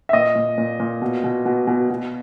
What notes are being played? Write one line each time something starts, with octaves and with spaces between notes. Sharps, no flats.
E5
A#2 D#5
A#2
A#2
A#2
B2
B2
B2
B2
B2